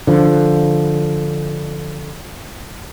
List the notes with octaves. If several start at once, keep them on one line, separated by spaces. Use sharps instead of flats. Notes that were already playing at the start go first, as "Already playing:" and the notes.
D3 F3